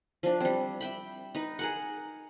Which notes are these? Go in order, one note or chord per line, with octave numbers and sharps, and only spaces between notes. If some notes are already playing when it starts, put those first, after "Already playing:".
F3 D4
G3 C4
E5 G5 B5
D#4 B4
G#4 A#4 F#5